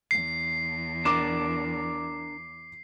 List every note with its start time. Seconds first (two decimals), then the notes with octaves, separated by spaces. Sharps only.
0.11 E2 C7
1.05 D4 A#4 D6 E7